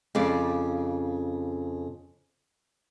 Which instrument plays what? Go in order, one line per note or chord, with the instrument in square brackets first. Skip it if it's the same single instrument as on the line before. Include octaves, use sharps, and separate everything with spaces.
[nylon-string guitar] F2 C#3 D5